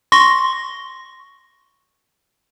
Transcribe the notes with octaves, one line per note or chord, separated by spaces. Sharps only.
C6 C#6 A#6